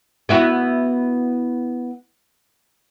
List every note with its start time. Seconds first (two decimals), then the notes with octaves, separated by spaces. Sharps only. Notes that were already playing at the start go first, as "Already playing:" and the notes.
0.29 B3 E4 F#4